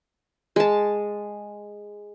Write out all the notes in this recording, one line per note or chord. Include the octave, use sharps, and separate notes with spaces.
G#3 A5